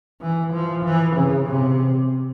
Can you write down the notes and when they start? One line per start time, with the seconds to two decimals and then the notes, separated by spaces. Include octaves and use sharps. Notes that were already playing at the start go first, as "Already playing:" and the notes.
0.21 E3
0.53 F3
0.84 E3
1.16 C#3
1.47 C3